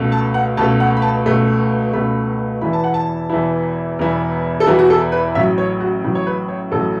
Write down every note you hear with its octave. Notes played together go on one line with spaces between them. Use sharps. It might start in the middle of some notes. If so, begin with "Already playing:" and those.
Already playing: C#2 B2 A3
A5
F#5
C#2 B2 A3 A5
F#5
B5
A5
C#2 B2 A3
C#2 B2 A3 B5
E1 E2 E3 B3 E4 B5
A5
F#5
A5
E1 E2 E3 B3 E4
E1 E2 E3 B3 E4
A4
E1 E2 E3 B3 E4 F#4
F#4
A4
B4
A1 A2 F#3 E5
C#5
F#4
A1 A2 F#3
C#5
B4
C#5
A1 A2 F#3 A4